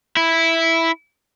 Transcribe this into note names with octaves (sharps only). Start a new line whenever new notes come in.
E4